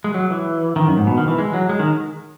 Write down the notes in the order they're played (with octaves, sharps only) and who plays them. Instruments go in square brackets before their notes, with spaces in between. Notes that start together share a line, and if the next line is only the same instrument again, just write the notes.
[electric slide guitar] G#3
F#3
E3
D#3
F#2
G#2
B2
D#3
E3
G#3
F#3
G#3
D#3